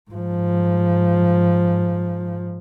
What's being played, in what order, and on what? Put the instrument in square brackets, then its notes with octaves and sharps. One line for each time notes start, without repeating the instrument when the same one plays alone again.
[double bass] G#2 F3